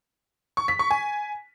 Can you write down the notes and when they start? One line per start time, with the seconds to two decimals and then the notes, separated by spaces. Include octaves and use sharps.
0.57 C#6
0.68 B6
0.79 C#6
0.91 G#5